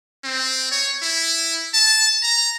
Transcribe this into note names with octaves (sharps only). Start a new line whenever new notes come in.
C4
C#5
E4
A5
A#5